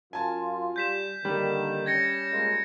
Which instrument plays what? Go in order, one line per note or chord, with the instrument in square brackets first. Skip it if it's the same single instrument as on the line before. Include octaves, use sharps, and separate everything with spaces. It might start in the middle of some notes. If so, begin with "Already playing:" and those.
[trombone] F#2 [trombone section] F4 [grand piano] G#5 A5
[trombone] G3 [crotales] G6 B6 E7
[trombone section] D3 D#3 [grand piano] G3 [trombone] A#3
[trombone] C#4 [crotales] G#6 A#6 C#7
[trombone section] G#3 A#3 F4